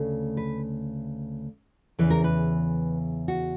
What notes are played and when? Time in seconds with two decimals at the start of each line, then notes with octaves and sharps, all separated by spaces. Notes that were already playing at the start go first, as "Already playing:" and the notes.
Already playing: D2 C#3 A3
0.37 B4
1.99 E2 C#3 E3 B4
2.10 A#4
2.24 B4
3.28 F#4